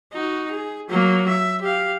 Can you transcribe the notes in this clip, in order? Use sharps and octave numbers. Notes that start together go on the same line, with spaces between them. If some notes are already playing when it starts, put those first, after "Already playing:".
D#4 F#4
G#4
F#3 A#3
E5
G4 F5